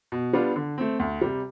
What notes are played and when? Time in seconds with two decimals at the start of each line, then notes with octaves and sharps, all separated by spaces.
0.12 B2
0.33 G3 B3 D4 F4
0.56 D3
0.78 A3 C4
1.00 D2
1.21 C3 G3